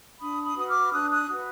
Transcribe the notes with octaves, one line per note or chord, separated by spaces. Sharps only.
D4 B5 D#6
B5 D#6
F#4 B4 D#6
D6 F6
D4 D#6 F#6
D#6 F#6
F#4 B4